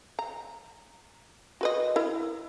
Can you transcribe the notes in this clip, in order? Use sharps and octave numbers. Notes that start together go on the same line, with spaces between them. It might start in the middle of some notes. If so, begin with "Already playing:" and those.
A#5
F#4 B4 D#5
E4 A#4